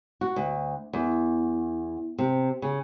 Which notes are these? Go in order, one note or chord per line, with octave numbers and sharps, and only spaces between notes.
F#4
D2
E2
C3
C#3